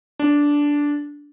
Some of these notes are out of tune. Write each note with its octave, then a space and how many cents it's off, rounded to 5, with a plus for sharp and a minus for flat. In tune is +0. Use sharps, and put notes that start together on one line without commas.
D4 -10